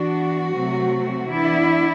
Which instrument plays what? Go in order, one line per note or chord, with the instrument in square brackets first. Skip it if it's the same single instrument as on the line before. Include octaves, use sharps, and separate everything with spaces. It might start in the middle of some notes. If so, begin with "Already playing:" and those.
Already playing: [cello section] E3 B3 D4 F#4
C3 F#3 A3 C4
E3 B3 D4 E4